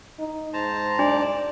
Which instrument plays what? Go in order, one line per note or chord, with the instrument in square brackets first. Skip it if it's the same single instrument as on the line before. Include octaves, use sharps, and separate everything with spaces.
[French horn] D#4
[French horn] G#2 [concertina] C5 A5 A#5
[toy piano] D4 [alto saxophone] D5